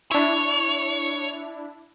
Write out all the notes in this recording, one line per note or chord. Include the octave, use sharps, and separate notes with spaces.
D4 E4 C#5